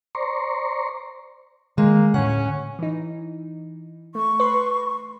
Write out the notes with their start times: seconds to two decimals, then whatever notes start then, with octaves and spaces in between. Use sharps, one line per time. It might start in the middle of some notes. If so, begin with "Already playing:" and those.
0.15 C5 D5 A#5 C6 C#6
1.78 D#3 G#3 A#3
2.14 A2 D3 C#4 F#5
2.79 E3 D#4
4.15 A3 C#6
4.40 B4 C6